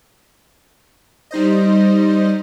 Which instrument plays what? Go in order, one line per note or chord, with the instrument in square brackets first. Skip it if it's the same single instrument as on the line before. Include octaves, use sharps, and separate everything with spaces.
[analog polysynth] G3 D#4 C5 D#5